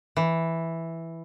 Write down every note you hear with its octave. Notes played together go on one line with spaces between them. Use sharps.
E3